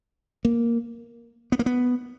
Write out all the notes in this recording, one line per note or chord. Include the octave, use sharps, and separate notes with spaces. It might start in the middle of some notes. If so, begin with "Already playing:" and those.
A#3
B3
A#3
B3